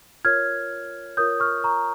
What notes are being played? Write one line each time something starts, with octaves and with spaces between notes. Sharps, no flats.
F4 A#4 C#5 F6 G#6
F4 A#4 C#5 D#6 G6
C#6 F6
A#5 C#6